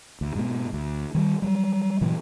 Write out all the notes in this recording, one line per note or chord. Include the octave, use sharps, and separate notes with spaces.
D2
G#2 B2
D2
D#3 F#3 G3
F#3 G3
A#2 C#3 E3 F#3